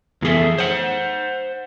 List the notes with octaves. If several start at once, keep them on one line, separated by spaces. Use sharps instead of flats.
F2 E3 B3 G#4 A4 E5
C5 F#5